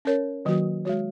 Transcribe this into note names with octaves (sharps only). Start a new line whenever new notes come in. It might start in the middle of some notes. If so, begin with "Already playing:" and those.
C#4 A#4 C#5
D#3 F#3 A#3 F#4
G#3 F#4 C#5